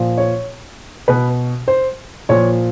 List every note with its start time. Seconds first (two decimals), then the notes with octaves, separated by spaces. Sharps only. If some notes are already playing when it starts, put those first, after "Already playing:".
Already playing: A#2 F3
0.17 C#5
1.08 B2 B4
1.68 C5
2.29 A#2 F3 C#5